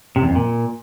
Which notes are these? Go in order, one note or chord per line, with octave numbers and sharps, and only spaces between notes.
C3
E2
F2
A#2